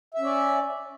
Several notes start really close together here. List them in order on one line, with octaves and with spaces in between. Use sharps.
E5 C#4 D5